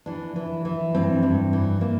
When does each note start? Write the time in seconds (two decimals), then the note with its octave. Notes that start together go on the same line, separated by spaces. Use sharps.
0.06 E3 D4
0.36 E3
0.65 E3
0.95 G2 C4
1.23 G2
1.53 E3
1.81 E3 A#3